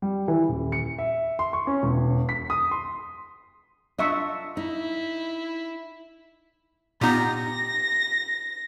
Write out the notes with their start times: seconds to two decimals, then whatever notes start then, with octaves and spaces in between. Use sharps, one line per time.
0.02 G3
0.28 E3
0.49 D#1
0.72 C#7
0.99 E5
1.39 C6
1.53 C#6
1.67 C#4
1.83 E1
2.29 B6
2.50 D#6
2.71 C6
3.99 D4 F4 D#5 E5 C#6
4.57 D#4 E4
7.01 A#2 B3 D#4 F4 G4 A#6